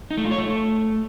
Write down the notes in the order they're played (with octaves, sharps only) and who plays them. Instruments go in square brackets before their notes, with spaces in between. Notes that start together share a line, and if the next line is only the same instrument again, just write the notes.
[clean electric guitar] D#4
A3
F4
C#5
A3